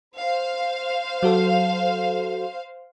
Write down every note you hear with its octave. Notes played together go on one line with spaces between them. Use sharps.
C5 F5
F#3 F#4 A4